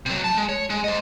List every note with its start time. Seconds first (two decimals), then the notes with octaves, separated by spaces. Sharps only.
0.06 C3 F#3
0.24 A2 A5
0.37 G#3
0.49 C#5
0.70 G#3
0.84 C5 D#5